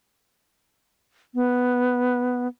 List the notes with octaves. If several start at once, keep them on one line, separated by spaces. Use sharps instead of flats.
B3